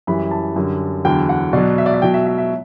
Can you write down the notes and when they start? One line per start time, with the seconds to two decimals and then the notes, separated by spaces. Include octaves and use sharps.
0.07 F#2 E3 G3 B5
0.31 A5
0.56 F#2 D3 G3
1.05 E2 D3 F#3 G5
1.29 F#5
1.53 B2 F#3 D5
1.78 E5
1.86 D5
1.94 E5
2.02 B2 F#3 G5
2.14 E5
2.27 E5
2.38 E5